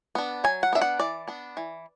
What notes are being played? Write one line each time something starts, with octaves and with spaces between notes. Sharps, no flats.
B3 D4
F#3 G#5
F#5
B3 D4 E5
F#5
E3 D5
B3 D4
E3